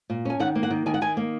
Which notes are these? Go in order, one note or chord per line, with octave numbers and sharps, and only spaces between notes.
A#2
C#4 G#5
D#3 F#5
A#3
F#5
D#3
D#3 G#5
F#5
D#3 G#5
A#3